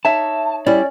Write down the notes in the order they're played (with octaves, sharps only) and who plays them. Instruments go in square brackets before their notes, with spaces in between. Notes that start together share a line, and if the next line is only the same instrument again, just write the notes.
[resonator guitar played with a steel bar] D#4 C#5 E5 [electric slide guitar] A5
[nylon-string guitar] G3 E4 [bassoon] C#4 [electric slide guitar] D5